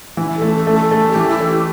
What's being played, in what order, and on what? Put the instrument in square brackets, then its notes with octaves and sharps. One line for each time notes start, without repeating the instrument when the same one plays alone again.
[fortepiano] E3 [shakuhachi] E4
[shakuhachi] A4
[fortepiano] A3
[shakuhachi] A4
[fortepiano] A3
[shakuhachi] A4
[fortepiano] A3
[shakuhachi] G4
[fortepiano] E3
[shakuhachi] E4
[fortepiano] A4
[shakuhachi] G4